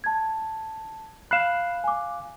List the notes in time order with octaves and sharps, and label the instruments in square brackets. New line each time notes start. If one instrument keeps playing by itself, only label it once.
[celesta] A5 G#6
[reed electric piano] F5 F#6 [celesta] B5 C7 E7
[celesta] G#5 D6